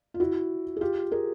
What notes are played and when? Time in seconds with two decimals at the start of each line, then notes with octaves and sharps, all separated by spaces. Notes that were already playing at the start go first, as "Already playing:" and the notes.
0.14 F4
0.20 E4 F#4
0.77 G#4
0.81 F4 G4
1.12 G#4 A#4